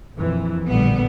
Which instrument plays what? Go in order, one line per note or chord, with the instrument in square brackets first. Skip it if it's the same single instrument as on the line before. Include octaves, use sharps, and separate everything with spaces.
[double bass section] A#1 F2 E3
[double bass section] A#1 A2 D3 [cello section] G3 B3